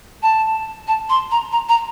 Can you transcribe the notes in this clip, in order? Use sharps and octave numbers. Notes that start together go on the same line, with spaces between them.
A5
A5
C6
A#5
A#5
A#5